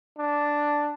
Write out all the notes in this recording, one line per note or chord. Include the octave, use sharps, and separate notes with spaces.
D4